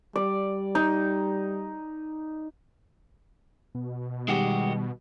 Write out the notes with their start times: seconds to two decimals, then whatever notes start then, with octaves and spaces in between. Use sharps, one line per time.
0.16 G3 D5
0.75 D#4
3.75 B2
4.28 D#3 G3 G#3 F#4 G4